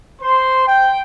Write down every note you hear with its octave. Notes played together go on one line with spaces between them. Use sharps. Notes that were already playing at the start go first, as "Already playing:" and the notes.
C5 C6
G5